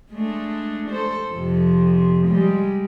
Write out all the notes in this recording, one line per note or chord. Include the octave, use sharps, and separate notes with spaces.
G#3 A3 D4
A4 C5
F2 C3
G3 G#3